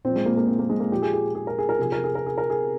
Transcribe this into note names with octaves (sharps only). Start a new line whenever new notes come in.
A#2 F3 C4
G#3
A#3
A#3
C4
A#3
G#3
A#3
A#2 F3 G4
G#4
G#4
G#4
A#4
G#4
A#4
C3 F3 G#4
A#4
G#4
A#4
G#4
A#4
G#4